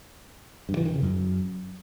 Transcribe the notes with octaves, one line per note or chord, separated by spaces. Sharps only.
G2
E3
D#3
C#3
F#2